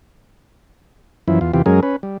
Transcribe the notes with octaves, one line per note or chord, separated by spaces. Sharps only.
F#2 E3 F3 E4
E2 F4
E2 C3 E3 F4 G4
F#2 F#3 G#3 C#4 G#4 A#4
C#4 B4
G3